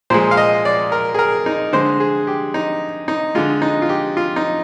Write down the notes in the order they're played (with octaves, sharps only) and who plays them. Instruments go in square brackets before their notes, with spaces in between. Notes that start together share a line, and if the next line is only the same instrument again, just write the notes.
[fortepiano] A#2 F3 G#3 C5
F5
D#5
D5
A#4
G#4
A#4
D#4
D3 G#3 C5
G#4
G4
D#4
D#4
D3 G#3 F4
D#4
F4
G4
F4
D#4